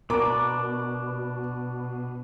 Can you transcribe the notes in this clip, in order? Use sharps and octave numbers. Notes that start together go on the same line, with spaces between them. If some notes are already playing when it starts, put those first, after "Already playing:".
B2 D4 A#4 A#5 D6